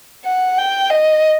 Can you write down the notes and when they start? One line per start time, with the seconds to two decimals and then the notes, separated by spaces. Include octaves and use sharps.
0.25 F#5
0.58 G5
0.90 D#5